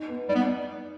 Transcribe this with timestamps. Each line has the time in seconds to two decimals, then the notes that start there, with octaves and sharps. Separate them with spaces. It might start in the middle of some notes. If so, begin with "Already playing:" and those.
Already playing: D#4
0.08 B3
0.29 G3 D#4
0.35 B3